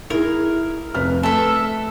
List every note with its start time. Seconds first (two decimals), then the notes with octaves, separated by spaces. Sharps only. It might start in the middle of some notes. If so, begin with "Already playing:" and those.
0.10 E4 G#4 A#4
0.94 F1 B4 F6
1.23 A3 A4 B4 E5